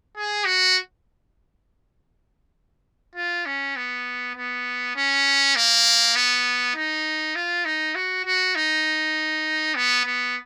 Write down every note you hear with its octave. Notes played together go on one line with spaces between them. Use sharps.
G#4
F#4
F4
C#4
B3
B3
C#4
A#3
B3
D#4
F4
D#4
F#4
F#4
D#4
B3
B3